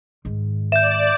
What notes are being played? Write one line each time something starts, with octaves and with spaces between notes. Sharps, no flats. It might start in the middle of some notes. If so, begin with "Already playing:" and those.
G#2 D#3
D5 E5 G6 E7